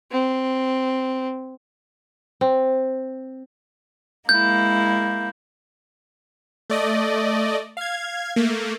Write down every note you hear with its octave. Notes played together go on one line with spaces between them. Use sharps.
C4
C4
G#3 A#3 E4 G6
A3 D5 D#5
F5 G#6
A3 A#3